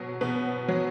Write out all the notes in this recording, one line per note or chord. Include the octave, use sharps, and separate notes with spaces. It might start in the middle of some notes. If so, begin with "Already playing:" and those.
Already playing: B2 F#3
B2 B3
F#3